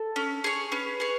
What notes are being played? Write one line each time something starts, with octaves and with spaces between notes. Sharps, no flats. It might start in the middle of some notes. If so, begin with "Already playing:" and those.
Already playing: A4
C#4
G#4 C#5
C#4 B4
G#4 C#5